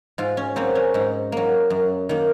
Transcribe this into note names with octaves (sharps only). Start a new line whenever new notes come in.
G#2 F4
C#4
F#3 A#3 C4
C#4
G#2 D#4
F#3 A#3
F#2
D#3 A#3